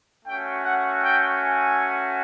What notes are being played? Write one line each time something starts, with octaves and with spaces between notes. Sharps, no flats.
A3 C#4 F#4 G5
F#5
G5
G#5